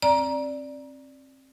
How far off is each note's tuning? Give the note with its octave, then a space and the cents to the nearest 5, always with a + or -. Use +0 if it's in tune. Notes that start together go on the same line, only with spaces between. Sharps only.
C4 +30 D5 +0 A#5 +20